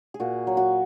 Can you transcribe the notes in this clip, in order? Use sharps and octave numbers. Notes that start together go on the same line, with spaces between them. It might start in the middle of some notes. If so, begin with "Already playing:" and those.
G#4
A#2 F#4
F#3
F#4